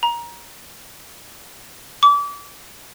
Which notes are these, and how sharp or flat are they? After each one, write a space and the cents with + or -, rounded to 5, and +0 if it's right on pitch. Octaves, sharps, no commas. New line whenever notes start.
A#5 +20
D6 -30